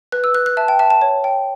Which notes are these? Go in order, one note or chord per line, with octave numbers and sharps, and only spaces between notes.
B4 F#6
E6
B4 F#6
F#6
E5 A5
G5
E5 A5
A5
C#5
G5